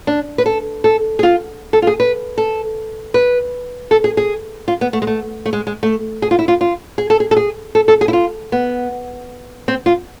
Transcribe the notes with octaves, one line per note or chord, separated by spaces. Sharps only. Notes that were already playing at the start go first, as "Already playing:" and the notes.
D4
B4
A4
A4
G#4
F4
A4
F4
G#4
B4
A4
B4
A4
G#4
G#4
F4
B3
A3
G#3
A3
A3
G#3
G#3
A3
G#4
F4
E4
F4
F4
G#4
A4
G#4
A4
G#4
A4
A4
G#4
E4
F4
B3
C4
F4